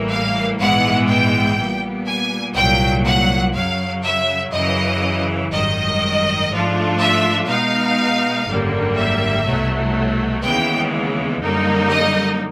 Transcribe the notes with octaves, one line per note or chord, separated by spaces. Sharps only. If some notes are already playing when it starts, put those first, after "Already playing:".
Already playing: A1 A2 E3 G3 A#3
F5
A#1 G#2 E3 G#3 B3 F#5
G5
A#2 G3 B3
G#5
C2 A#2 F#3 G5
F#5
F#2 C#3 F#3 F5
E5
F#2 C#3 E3 D#5
G#1 F#2 D#3 G3 D#5
G#2 F3 A3 D4 F4
E5
B2 G#3 B3 D#4 F5
G#1 F#2 D3 G3 A#3
E5
C2 B2 F#3 A3
D#2 C#3 E3 G#3 B3 G5
F#2 D3 G3 A#3 D#4
D#5